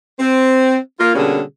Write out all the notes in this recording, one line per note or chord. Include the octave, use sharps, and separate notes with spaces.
C4
A#3 F4
B2 D3 G3 A#3 C#4 G#4